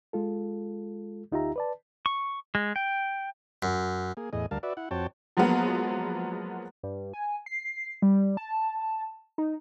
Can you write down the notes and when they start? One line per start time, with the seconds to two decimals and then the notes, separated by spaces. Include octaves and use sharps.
0.13 G#3 F4 A4
1.32 D2 D#4 F4 G4 E5 A#5
1.56 B4 D5 A5
2.06 C#6
2.55 G#3
2.76 G5
3.63 F#2
4.17 A#3 G#4
4.33 E2 A2 G#4 D#5
4.51 D2 G3 A#4 F5 A5
4.63 F#4 B4 D5 E5
4.77 E4 F#5
4.91 F2 C4 F#4 C#5 G5 A5
5.37 F3 F#3 G#3 A#3 B3 F#4
6.83 G2
7.13 G#5
7.46 C7
8.02 G3
8.37 A5
9.38 D#4